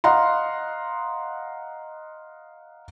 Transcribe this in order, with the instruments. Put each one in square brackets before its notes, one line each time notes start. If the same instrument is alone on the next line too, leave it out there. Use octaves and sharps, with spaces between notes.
[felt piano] D#5 F5 F#5 A#5 C6